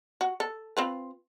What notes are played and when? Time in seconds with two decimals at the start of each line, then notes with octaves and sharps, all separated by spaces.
0.21 F#4
0.40 A4
0.77 C4 F4 B4